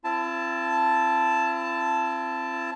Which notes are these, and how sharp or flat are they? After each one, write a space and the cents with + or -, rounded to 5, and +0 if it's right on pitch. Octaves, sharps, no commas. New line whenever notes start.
C4 +10 E4 +45 A5 +0